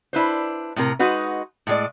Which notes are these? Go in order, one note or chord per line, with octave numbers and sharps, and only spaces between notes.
D4 E4 B4 C5
A2 C3 A#4
G#3 D#4 F#4 B4
A2 G#3 D5